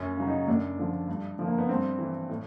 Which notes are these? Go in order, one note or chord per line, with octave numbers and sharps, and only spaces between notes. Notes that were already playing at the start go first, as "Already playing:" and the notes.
Already playing: F#2 C#4
C#3 F#3
D#4
F#2 D4
D3 F3
G2
D3 F3
A#3
B3
G2 C4
E3
A2